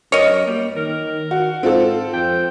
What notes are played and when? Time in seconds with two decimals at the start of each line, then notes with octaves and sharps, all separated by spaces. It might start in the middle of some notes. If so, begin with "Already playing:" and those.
0.12 F#2 A#4 C#5 D#5
0.47 G3 A#3
0.76 D#3 A#4
1.31 F#4
1.63 G#2 C4 F4 A4
2.13 F2 G5